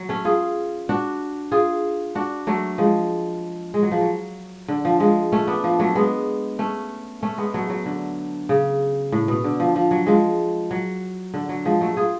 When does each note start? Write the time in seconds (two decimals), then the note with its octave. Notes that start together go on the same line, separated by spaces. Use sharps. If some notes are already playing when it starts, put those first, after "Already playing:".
Already playing: F#3
0.09 A3 C#4
0.25 F4 G#4
0.89 D4 F#4
1.52 F4 G#4
2.15 D4 F#4
2.47 F#3 A3
2.78 F3 G#3
3.74 G#3
3.83 F#3
3.92 F3
4.01 F#3
4.68 D3
4.85 F3
5.00 F3 G#3
5.32 A3 C#4
5.47 B3 D4
5.64 F3
5.79 F#3 A3
5.95 G#3 B3
6.59 A3 C#4
7.23 A3 C#4
7.38 G#3 B3
7.54 F#3 A3
7.69 F#3
7.85 D3
8.49 C#3
9.12 A2
9.28 B2
9.44 D3
9.60 F3
9.76 F3
9.91 F#3
10.06 F3 G#3
10.71 F#3
11.34 D3
11.49 F#3
11.65 F3 G#3
11.81 F#3 A3
11.97 F4 G#4